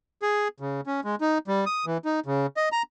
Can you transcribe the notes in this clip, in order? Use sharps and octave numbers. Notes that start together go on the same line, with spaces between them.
G#4
C#3
C#4
G#3
D#4
G3
D#6
E3
D#4
C#3
D#5
A#5